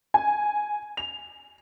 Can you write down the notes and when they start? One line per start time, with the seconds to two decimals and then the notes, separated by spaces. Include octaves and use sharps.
0.14 G#5
0.97 F7